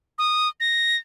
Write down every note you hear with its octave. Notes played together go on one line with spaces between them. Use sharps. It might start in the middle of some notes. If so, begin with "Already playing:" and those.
D#6
A#6